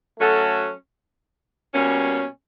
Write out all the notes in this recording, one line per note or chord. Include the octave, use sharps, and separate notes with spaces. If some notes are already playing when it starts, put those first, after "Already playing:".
F#3 A3 C#4 F#4 A4
B2 G3 A#3 C#4